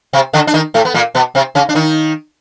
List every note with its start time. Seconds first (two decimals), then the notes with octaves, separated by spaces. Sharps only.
0.13 C3 C4
0.33 D3 D4
0.47 D4
0.54 D#3 D#4
0.74 A2 A3
0.85 B3
0.94 A#2 A#3
1.15 B2 B3
1.35 C3 C4
1.55 C#3 C#4
1.69 D4
1.75 D#3 D#4